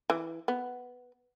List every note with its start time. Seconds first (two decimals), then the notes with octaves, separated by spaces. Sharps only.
0.10 E3
0.48 B3